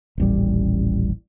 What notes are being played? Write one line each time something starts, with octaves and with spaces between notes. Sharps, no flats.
D#1 A1 G3